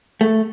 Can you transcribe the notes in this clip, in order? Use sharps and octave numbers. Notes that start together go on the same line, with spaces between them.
A3